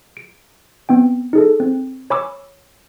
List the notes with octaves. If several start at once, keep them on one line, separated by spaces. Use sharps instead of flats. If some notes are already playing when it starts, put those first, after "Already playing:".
D7
B3 C4 G5
D#4 G#4 A4
C4
C#5 G#5 B5 C#6 D6 E6